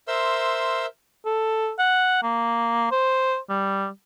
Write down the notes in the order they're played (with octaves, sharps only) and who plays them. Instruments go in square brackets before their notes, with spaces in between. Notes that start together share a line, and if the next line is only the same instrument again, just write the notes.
[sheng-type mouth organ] A#4 C5 E5 C6 E6
[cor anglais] A4
F#5
A#3
C5
G3